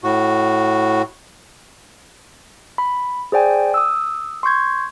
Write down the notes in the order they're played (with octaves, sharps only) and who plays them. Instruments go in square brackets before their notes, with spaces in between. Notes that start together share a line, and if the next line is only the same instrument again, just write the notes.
[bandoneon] A2 F#4
[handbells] B5
G#4 C5 D5 G5 G#5
D#6 E6
C6 C#6 G6 G#6